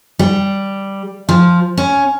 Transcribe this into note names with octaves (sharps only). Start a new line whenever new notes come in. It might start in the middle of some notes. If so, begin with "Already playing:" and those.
G3
F3
C#4